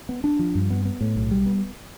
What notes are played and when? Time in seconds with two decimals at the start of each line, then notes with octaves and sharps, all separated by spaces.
0.09 B3
0.24 D4
0.39 F3
0.55 G2
0.70 B3
0.85 B3
1.01 A2
1.16 B1
1.31 G3
1.46 B3